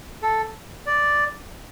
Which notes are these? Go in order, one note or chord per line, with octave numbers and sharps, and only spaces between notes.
A4
D5